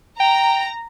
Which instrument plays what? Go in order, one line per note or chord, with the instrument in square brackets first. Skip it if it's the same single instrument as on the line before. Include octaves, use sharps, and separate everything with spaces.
[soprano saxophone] G5 [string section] A#5